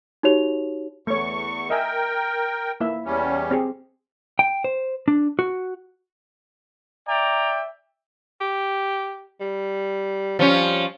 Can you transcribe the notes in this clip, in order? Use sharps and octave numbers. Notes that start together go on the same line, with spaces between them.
D#4 F#4 G4 C#5 F7
E2 A3 C#5 C#6
A#4 D#5 E5 G5 G#5
A#3 E4 E5
E2 G3 C#4
C4 G4 G#4
G5
C5
D4
F#4
D5 E5 G5 A#5
G4
G3
F3 G3 C#4